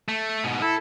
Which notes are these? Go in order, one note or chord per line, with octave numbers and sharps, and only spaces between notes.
A3
G#2 B2
E4 A4